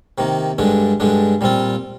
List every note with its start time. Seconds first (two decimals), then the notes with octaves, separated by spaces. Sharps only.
0.18 C3 D#3 A#3
0.58 G2 D3 G#3 D4
1.00 G2 D3 G#3 D4
1.41 A#2 G3 C4 F4